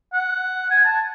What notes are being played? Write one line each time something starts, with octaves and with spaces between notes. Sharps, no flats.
F#5
G#5
A5